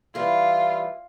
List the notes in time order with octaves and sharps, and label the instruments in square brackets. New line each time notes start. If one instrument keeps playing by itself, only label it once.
[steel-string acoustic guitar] E3 G3 E4 [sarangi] F4